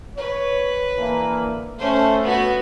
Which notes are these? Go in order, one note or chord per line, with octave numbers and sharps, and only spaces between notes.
B4 C#5
D3 E3 A#3
A3 C#4 C5
B3 F#4